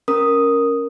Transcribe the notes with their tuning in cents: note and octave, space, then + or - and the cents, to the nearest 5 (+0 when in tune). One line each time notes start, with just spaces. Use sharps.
C#4 +0 A#4 +0 D#6 +0